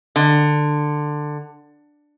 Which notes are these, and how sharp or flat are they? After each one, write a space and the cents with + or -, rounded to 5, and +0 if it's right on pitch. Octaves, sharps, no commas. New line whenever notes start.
D3 +15